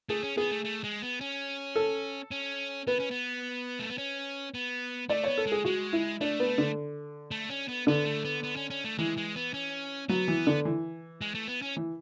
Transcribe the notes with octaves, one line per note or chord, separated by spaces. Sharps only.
A3 G#4
C#4
B3 G#4
A3
A3
G#3
B3
C#4
A4
C#4
B3 B4
C#4
B3
A3
B3
C#4
B3
A3 D5
B3 C#5
A4
G#3
G#4
G#3 F#4
E4
A3 D4
B3
D3
A3
C#4
B3
D3 B3
A3
B3
B3
C#4
C#4
A3
E3 G#3
G#3
B3
C#4
F#3 B3
E3
D3
E3
G#3
A3
B3
C#4
E3